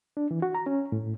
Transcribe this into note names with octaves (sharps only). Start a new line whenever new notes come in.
D4
E3
F#4
A#5
C#4
A2